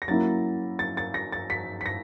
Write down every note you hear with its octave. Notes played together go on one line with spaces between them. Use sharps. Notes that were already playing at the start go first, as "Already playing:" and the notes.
A#6
F#3 A#3 C#4 E4 A6
A6
A6
A#6
A6
B6
B6
A#6